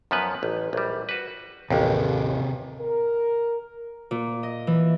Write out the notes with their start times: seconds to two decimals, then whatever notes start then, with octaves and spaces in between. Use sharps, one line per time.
0.11 F#2 F3 B3 B4
0.43 A1
0.73 A#1 G3
1.09 F#4 B4
1.71 A1 D#2 C3 G#4
2.81 A#4
4.11 A#2
4.43 D#5
4.67 E3